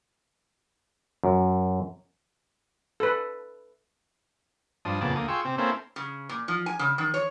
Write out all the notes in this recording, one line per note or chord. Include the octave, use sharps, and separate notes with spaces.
F#2
A4 B4
G2 F3 D4 D#6
F2 A#2 C#3 B3 A5 D6
D2 A#3 D#6
F4 G#4 G5 C6 C#6 E6
C3 C4
A#3 C4 C#4 E4 A4 C5
C#3
A#2
F3
G#5
C#3
D#3
C#5